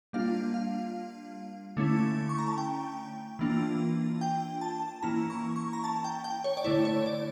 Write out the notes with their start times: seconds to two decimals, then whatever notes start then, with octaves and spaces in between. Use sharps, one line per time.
0.13 G3 A#3 D4 F4 F5
0.54 F5
1.77 D3 A3 C#4 E4
2.29 C#6
2.38 A#5
2.48 A5
2.58 G5
3.39 E3 A#3 D4 F4
4.21 G5
4.61 A5
5.03 E3 A#3 C#4 E4 A#5
5.30 C#6
5.56 C#6
5.73 A#5
5.84 A5
6.04 G5
6.24 G5
6.44 C#5
6.57 D5
6.64 D3 A3 E4 C#5
6.85 C#5
7.06 D5